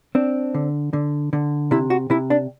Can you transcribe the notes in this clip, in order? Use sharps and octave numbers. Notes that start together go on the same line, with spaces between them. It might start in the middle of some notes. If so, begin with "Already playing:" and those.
C4 D4
D3
D3
D3
C3 E4
F#4
C3 E4
D4